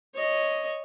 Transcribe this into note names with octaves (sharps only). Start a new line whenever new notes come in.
C#5 D#5